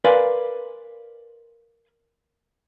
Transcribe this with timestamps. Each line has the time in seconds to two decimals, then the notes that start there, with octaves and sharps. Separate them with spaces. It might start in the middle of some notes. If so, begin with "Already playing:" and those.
0.04 A#4 B4 D5 F5 G#5 C6